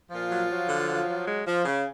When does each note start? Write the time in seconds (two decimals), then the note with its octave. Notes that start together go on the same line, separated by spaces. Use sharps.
0.11 A#2 F3 F4
0.31 F#3
0.50 F#3
0.69 D3
0.88 F#3
1.07 F#3
1.27 G#3
1.46 F3
1.65 C#3